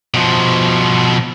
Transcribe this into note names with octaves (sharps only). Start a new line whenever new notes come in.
B2 F3